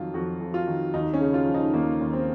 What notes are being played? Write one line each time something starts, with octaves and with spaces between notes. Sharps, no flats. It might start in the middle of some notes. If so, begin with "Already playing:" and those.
Already playing: F2 D#3 F#3 F4
F2 F#4
F2
F4
D#3
D#2 D#4
C#4
C#3
F4
F3
D#4
D#2 A#3
D#2
C4